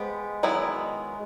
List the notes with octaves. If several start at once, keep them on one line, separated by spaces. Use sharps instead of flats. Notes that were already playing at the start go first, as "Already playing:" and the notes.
Already playing: G#3 B3 G4 C5
D#3 F#3 B3 E4